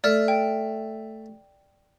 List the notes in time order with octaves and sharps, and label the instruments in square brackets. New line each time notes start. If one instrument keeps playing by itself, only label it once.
[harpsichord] A3 [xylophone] D5 F6
[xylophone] G5